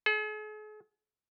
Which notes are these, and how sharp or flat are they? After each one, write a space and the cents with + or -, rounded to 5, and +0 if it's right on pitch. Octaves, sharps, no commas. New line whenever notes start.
G#4 +45